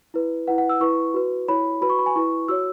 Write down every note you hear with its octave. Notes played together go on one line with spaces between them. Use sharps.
E4 B4
E4 B4 F#5
F#5
E6
E4 B4 C#6
F#4 B4
E4 C#5 B5
F#4 B4 B5
C#6
B5
G#5
E4 B4 C#6
F#4 C#5 E6